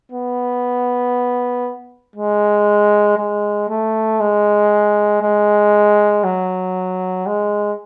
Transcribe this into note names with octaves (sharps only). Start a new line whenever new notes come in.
B3
G#3
G#3
A3
G#3
G#3
F#3
G#3